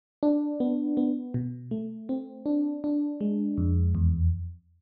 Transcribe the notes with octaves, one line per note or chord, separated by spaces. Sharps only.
D4
B3
B3
B2
A3
C4
D4
D4
G#3
F2
E2